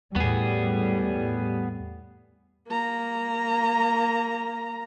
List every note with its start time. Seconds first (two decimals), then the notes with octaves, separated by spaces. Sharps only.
0.16 E2 A2 G3 B3 G#4
2.68 A#3 A#5